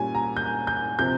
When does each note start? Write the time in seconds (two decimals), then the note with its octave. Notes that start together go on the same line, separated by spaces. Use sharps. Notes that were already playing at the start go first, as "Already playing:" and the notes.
Already playing: A#2 G3 C#4 G#5
0.15 A#5
0.37 G6
0.67 G6
0.99 C3 F3 C4 G6